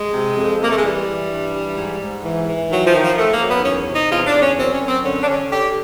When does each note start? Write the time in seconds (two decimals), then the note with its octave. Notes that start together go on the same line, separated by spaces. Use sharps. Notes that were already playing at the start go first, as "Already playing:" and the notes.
Already playing: G#3
0.14 C3
0.37 F2
0.61 C3 A#3
0.70 A3
0.77 G#3
0.84 E3 G3
1.08 E3
1.30 G2
1.53 E3
1.77 G#2
2.01 G#2
2.24 E3
2.48 E3
2.71 D#3 F#3
2.86 F3
2.94 D#3
3.02 F3
3.18 D#3 A3
3.32 A#3
3.41 F#2
3.49 B3
3.64 E2 C#4
3.88 C3
3.95 D#4
4.11 E2 F4
4.27 D4
4.34 E2
4.41 C#4
4.57 F#2 C4
4.72 C#4
4.80 F#2
4.88 C4
5.04 D3 C#4
5.23 D4
5.27 D3 C#4
5.51 D3 G4